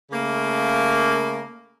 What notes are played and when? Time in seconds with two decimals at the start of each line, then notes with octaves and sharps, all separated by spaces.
0.12 C#3 A3 A#3